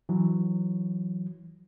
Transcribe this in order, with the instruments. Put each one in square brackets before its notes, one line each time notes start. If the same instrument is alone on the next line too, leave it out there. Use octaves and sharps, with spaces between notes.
[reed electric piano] E3 F#3